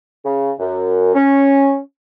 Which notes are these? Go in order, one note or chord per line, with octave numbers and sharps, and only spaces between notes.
C#3
F#2
C#4